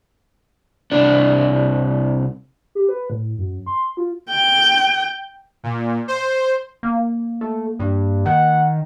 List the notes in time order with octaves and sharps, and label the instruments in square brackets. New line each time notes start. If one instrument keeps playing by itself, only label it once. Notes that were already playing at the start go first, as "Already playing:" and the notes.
[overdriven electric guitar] C2 D4
[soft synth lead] G4
B4
A2
F#2
C6
F4
[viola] G5
[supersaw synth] A#2
C5
[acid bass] A#3
[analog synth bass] A3
G2
[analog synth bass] D#3 [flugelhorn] F#5